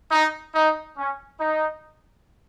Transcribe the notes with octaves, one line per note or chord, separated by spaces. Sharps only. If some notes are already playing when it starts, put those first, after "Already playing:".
D#4
D#4
C#4
D#4